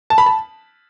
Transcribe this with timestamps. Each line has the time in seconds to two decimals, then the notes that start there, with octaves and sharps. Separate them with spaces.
0.10 A5
0.18 B5
0.26 A5